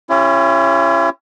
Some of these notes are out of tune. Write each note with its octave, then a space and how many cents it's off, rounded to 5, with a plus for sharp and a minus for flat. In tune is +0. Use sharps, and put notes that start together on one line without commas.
C#4 -15 E4 +40 G4 +15